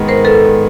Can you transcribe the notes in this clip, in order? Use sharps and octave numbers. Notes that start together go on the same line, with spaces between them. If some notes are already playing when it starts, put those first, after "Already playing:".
Already playing: G#2 D#3 G#3 B3
A#4 C5
A4 B4